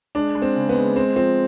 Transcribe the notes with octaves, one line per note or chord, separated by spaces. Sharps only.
G#3 D4
G#3
C4
C#3
B3
G#3
G#3 C4
F3 C4